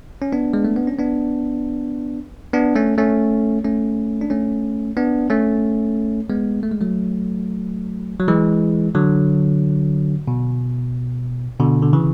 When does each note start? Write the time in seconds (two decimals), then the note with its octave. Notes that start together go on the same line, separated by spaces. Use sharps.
0.22 C#4
0.33 B3 D4
0.53 G#3
0.65 A3
0.76 B3
0.87 C#4
0.99 B3 D4
2.53 B3 D4
2.75 A3 C#4
2.98 A3 C#4
3.64 A3 C#4
4.21 D4
4.30 A3 C#4
4.97 B3 D4
5.30 A3 C#4
6.29 G#3 B3
6.63 A3
6.72 G#3
6.81 F#3 A3
8.19 F#3
8.28 E3 G#3
8.95 D3 F#3
10.28 B2
11.60 B2 D3
11.82 D3
11.93 C#3 E3